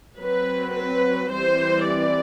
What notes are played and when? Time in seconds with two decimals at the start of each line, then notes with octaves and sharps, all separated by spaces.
0.19 F#3 C4 B4
0.75 B4
1.31 E3 G3 C4 C5
1.87 D5